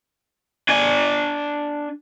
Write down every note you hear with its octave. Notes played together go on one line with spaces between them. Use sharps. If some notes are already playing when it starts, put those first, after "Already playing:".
D4 G#5